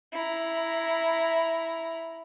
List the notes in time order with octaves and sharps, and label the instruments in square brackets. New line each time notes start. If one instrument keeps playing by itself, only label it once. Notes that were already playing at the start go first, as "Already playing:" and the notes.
[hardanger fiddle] E4 A#5